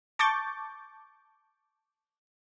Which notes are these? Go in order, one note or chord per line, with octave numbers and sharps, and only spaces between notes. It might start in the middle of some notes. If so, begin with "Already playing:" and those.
A5 C#6 D6 G6 A6